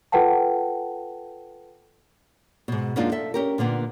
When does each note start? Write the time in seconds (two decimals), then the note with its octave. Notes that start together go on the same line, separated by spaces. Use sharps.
0.12 F4 A4 B4 F#5 G5 A5
2.68 G#2 B2
2.96 F#2 G#3 A#3 D4 D#4 F4
3.12 A4 E5
3.34 C#4 G4 A#4
3.58 A#2 D3 A#3 B3